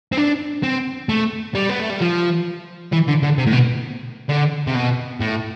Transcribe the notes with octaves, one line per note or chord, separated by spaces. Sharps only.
C4
D4
C4
A3
G3
B3
A3
G3
F3
E3
D3
D3
C3
A2
B2
D3
C3
B2
A2